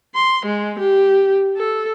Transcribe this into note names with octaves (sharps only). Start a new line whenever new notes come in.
C6
G#3
G4
A4